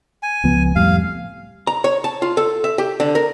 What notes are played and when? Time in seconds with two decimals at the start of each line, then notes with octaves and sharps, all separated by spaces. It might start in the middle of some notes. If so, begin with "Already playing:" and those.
0.23 G#5
0.44 C#2 F3 B3
0.76 F2 A2 G3 F5
1.67 A#5
1.84 C#5
2.04 A5
2.22 F4
2.37 A4
2.64 E5
2.78 G4
3.00 D3
3.15 A#4